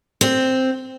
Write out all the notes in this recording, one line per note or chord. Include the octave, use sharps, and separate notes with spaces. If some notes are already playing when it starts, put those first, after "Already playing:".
C4